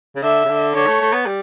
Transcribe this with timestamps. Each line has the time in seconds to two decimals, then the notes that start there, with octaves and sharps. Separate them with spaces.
0.16 C#3
0.23 D3 E5
0.45 C#3
0.50 D3
0.75 D3 C#5
0.87 A3
1.01 A3
1.13 B3
1.27 G3